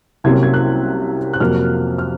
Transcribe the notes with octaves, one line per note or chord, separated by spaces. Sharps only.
C2 C3 F#3 A#3 C#4 G#6
G#6
F#6
F#6
F2 C3 F#3 A#3 F6
F6